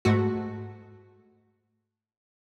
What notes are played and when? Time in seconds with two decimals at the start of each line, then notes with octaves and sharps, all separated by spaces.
0.05 G#2 A3 F#4